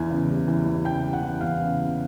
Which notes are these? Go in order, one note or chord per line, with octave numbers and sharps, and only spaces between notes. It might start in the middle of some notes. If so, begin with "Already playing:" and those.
Already playing: E2 E3 G#5
C#3
G3
E3
E2
C#3 G5
G3
F#5
E3
E2 F5
C#3
G3